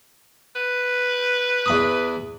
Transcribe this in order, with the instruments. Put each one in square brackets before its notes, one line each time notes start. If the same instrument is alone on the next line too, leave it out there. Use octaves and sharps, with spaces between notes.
[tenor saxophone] B4
[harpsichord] E2 B5 D#6